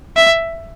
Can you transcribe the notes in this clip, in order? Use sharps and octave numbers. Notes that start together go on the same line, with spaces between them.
E5